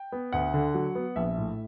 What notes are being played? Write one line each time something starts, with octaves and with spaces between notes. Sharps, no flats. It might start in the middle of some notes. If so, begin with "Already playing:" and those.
Already playing: G5
B3
D2 F#5
D3
F#3
B3
A#1 E5
A2